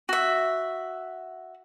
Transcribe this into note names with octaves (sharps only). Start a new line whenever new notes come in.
F#4 E5